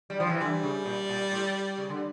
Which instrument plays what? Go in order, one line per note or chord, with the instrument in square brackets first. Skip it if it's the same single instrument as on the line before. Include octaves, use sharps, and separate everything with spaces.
[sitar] G3
F3
E3
[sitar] D3 [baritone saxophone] G3
[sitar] C#3
A#2
A#2
A2
C#3
D3